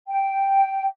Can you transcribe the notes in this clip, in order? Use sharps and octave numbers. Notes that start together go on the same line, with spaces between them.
G5